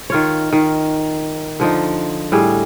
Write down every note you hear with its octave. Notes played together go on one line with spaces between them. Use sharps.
D#3 F4 C#5
D#3
D3 F3 D#4
A2 G3 G#4